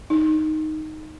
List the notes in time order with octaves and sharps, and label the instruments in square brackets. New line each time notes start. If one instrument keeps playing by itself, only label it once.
[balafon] D#4